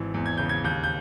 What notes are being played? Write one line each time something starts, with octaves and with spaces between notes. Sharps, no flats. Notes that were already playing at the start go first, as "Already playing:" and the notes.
Already playing: G#1 E3
E2
G#6
C#3 G6
G#6
D#2 G6
G6